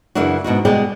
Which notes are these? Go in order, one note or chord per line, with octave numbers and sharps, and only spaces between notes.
F#2 C#3 E3 D4 F#4
G#2 B2 D#4 F#4
B2 G3 G#3 G#4 D5 G5